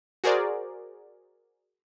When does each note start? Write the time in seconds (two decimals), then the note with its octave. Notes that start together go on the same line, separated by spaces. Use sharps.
0.24 F#4 G#4 A#4 C5 D5